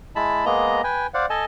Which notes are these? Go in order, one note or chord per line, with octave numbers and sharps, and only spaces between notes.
G#3 E4 A5 B5
G#3 A#3 B3 D#5 A#5
B4 G5 G#5
C5 D5 F5 F#5
A4 D#5 G#5 A5